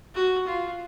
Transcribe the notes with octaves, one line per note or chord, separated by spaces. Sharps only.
F#4
F4